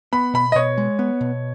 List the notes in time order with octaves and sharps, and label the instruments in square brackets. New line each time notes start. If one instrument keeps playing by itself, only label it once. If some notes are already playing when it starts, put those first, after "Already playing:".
[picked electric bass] B3 [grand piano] B5
[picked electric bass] B2 [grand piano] B5
[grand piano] D#5
[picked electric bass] B2 [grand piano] C#5
[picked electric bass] G#3
B3
B2